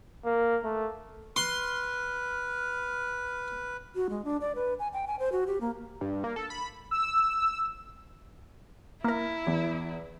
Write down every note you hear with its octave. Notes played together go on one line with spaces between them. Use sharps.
A#3
A3
B4 C6 F6
F#4
G#3
D4
D5
B4
G#5
G5
G#5
C5
F#4
G4
A#3
G2
A#3
A4
B5
E6
A#3 E4 A#4
E2